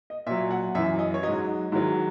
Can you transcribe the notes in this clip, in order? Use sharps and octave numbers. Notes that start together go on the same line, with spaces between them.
D#5
A#2 F#3 E5
F#5
F#2 E3 E5
D#5
C#5
G#2 F#3 D#5
G#2 D#3 F#3 E4